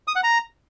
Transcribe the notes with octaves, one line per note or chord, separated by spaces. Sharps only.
D#6
F#5
A#5